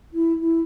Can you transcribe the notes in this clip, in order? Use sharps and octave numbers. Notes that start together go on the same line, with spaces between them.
E4
E4